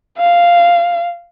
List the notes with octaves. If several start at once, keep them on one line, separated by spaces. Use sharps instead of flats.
F5